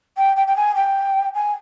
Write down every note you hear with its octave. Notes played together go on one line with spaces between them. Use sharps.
G5
G5
G5
G#5
G5
G#5